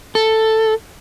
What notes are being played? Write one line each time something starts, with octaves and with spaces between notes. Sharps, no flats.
A4